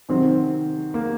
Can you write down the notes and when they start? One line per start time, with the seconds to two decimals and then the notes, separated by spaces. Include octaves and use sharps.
0.09 C3 D#3 F#3 C4
0.94 A#3